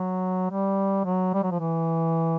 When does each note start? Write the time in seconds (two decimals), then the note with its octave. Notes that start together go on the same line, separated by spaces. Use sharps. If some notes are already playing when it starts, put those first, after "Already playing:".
Already playing: F#3
0.51 G3
1.05 F#3
1.34 G3
1.43 F#3
1.51 F3
1.60 E3